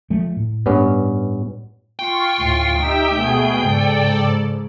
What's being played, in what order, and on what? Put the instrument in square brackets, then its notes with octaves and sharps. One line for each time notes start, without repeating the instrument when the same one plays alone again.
[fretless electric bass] F3 A3
A2
[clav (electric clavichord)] G2 B3 C#4
[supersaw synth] F4 C6 C#6 [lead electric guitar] G5
[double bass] D2 A2
[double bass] D#4 [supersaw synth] G4 E5
[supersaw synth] B2 G#4 [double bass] A3 B3
[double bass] G#2 C#3 [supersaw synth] A4 D5